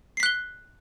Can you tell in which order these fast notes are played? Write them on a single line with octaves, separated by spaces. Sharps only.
C7 B6 F#6 G7